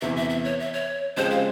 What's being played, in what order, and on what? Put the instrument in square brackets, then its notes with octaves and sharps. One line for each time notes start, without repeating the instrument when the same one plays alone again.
[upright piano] E2 C3 E3 [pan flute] E5
[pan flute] E5
E5
C#5
E5
C#5
[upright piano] C#3 F3 G#3 C4 G4 [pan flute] C5
[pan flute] F5